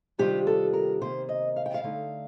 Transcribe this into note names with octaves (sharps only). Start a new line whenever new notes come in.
C3 D#3 G3 D4 F4 G4
A4
A#4
C3 D#3 A#3 C5
D#5
F5
G5
F5
D3 A3 D#4